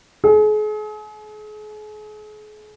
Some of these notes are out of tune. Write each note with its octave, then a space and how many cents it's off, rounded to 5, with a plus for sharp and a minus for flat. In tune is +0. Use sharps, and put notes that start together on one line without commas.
G#4 +40